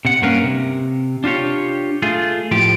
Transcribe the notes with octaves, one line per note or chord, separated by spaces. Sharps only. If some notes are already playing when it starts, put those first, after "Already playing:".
C3 F#5
G2 A#3 C#4 A#4 B4 F5
C3
D4 F4 G4 C#5
A3 F4 G#4
A2 F3 G4